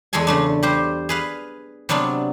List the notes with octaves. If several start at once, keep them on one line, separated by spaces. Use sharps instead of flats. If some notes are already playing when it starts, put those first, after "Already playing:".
E2 G#3 G#4 A4 G#5
C#3 A3 D4
G3 G4 C5
G#4 B4 F5
C3 F#3 B3 D4 F4